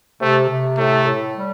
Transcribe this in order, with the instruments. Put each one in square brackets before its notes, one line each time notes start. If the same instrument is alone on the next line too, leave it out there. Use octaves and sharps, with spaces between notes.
[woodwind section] C3 [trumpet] A3
[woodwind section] C3
[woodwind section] A2 [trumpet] A3
[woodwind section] A2
G3